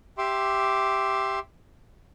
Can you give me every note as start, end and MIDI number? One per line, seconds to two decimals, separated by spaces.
0.18 1.39 67
0.18 1.39 76
0.18 1.39 84
0.18 1.39 86